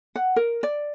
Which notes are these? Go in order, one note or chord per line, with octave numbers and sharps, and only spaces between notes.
F#5
A#4
D5